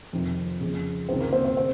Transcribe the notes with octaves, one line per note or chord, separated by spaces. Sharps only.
F2 C3 D#3
F2 C#3
C#2 C3 D#3 C4
A#3
C4
C4
C#3 C4